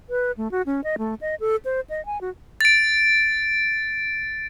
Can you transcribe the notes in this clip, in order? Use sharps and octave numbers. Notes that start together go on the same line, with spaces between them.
B4
A3
F#4
C#4
D#5
A3
D#5
A4
C5
D#5
G#5
F#4
A6 D7